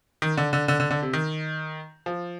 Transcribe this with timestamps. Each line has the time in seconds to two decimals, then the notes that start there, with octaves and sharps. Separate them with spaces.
0.22 D#3
0.37 D3
0.53 D3
0.68 D3
0.80 D3
0.91 D3
1.02 C3
1.13 D#3
2.06 F3